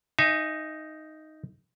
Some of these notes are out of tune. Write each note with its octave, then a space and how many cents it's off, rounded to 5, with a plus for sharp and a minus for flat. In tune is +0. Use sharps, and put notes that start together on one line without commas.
D#4 +0 E5 +35 G#5 -5